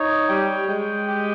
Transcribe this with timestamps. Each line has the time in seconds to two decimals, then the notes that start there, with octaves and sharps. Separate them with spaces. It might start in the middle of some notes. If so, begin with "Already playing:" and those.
Already playing: D#4 C#5
0.29 G3 G5
0.68 G#3 G5
1.08 G4